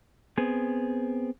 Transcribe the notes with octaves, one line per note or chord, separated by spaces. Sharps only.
B3 C4 G#4